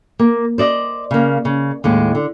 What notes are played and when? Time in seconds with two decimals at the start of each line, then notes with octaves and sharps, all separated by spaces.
0.19 A#3
0.58 C5 D5 D#5
1.11 C#3 A#3
1.45 C#3
1.84 D#2 A2 G#3
2.15 D3